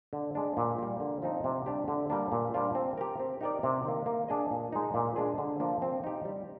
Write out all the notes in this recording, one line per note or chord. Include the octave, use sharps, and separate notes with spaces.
D3
G#3 D4
A#2
G3 A#3
D3
F3 C4 D#4
C3
G3 D4 G4
D3
G3 A#3 D4
A#2
G3 D4 F4 C5
C4
G4 A#4
C4
D#4 G4 A#4 D5
C3
D#3 A#3
A#3
D4 G#4 D#5
A#2
G#3 D#4
A#2
G#3 D4 G#4
D3
F3 A#3 D4
C4
D#4 G4
G3